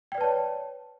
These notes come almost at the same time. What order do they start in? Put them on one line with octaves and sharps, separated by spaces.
G5 D5 B4 A5 C#5